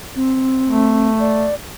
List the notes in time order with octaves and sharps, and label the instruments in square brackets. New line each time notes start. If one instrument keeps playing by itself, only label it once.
[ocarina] C4
[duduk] A3
[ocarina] D5